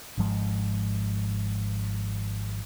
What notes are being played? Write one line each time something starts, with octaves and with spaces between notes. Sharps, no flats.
G#1 G#2 F3 G#3